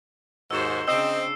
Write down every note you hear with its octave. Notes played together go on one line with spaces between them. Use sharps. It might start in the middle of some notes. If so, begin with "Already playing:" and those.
D#2 G#2 F#4 C5 E6 E7
C#3 C4 D4 D#5 E6 C7